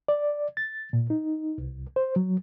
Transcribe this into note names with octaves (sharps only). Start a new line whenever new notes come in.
D5
A6
A#2
D#4
C2
C5
F#3